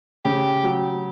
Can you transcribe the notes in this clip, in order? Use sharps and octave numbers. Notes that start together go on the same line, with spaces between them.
C#3 G4
F#3